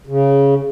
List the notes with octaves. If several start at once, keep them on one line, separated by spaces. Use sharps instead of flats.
C#3